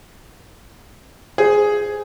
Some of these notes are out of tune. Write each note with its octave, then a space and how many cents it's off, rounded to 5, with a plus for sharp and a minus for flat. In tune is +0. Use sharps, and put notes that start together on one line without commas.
G#4 +0 C5 -15